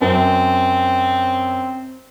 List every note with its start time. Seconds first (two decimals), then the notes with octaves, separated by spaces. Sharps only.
0.01 F#2 C4